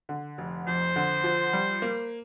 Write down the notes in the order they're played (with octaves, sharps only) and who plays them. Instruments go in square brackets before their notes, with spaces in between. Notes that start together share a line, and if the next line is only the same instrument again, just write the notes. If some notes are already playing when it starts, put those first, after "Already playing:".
[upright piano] D3
F1
[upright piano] F2 [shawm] C5
[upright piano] D3
F3
G3
A#3